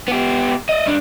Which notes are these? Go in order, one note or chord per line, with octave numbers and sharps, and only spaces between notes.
B3 G4
D5 D#5
G2 D4